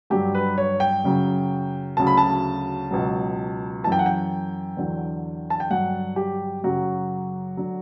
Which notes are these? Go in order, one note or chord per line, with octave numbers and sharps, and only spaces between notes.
G2 D3 F#3 G4
B4
C#5
G5
F#2 C#3 F#3
D2 C#3 F#3 A5
B5
A5
C#2 B2 F#3
F#2 E3 G5 A5
F#5
G5
E2 D3 F#3
A5
G5
G2 D3 F#3 F#5
G4
F#2 C#3 F#3 F#4
D3 F#3